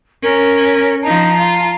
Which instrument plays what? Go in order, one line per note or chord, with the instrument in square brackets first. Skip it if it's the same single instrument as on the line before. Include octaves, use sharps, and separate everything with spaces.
[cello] C#4 [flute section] A#4
[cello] F3 D#4 [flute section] A5 A#5
[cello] F4